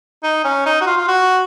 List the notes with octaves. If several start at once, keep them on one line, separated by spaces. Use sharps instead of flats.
D#4
C#4
D#4
F#4
F4
F4
F#4